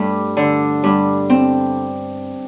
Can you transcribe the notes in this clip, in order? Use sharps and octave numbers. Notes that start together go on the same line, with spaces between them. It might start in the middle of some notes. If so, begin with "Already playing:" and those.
Already playing: G2 A3
D3
G2
C4